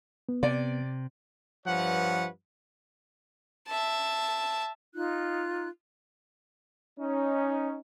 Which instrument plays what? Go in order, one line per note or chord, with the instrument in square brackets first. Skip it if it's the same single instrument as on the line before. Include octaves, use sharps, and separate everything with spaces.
[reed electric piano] B3
[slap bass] C3 [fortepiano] D5
[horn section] G2 F3 B4 C#5 F#5
[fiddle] E5 A5
[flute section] D#4 F4 F#6
[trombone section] C#4 D#4